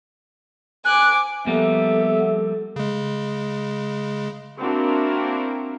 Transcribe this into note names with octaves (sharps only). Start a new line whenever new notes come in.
G#5 D6 F#6
F3 G3 A#3 B3 A4 E5
C#3 G#3
A#3 C4 D4 E4 F#4 A#4